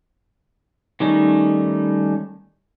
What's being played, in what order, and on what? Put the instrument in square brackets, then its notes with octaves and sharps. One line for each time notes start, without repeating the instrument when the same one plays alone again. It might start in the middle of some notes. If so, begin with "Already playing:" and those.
[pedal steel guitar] D#3 G3 A3 C#4 D#4